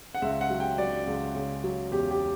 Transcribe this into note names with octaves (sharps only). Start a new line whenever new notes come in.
F#5
C#2 E5
F#5
F#3
G5
F#3 D5
C#2
C#3
F#3
E2 G4
G4